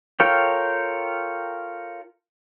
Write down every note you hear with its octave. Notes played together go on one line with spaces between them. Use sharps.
F4 A4 A#4 C#5 G5